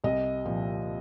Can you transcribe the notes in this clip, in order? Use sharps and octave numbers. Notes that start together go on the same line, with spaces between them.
C2 D#5
A#2 F3